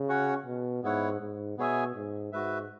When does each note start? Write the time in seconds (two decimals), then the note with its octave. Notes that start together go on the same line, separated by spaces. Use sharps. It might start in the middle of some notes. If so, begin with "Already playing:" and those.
Already playing: C#3
0.09 C#4 F#4 C#5 F#5
0.46 B2
0.83 G#2 B3 E4 C#5 F#5
1.20 G#2
1.58 B2 B3 G#4 C#5 E5 G#5
1.95 G#2
2.33 G#2 F#4 B4 E5